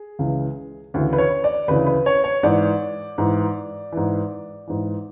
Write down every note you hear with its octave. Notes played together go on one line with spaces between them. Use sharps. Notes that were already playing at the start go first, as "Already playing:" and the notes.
Already playing: G#4
C#2 C#3 E3
D2 C#3 E3
B4
C#5
D5
D2 C#3 E3 B4
B4
C#5
C#5
G#2 E3 D5
G#2 E3
G#2 E3
G#2 E3